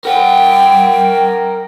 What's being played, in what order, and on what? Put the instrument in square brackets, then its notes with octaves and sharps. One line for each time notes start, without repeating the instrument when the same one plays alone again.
[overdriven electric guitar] A#4 F#5 [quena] G5